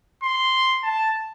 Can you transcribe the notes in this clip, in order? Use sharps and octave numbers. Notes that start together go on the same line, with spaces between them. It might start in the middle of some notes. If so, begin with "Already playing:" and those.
C6
A5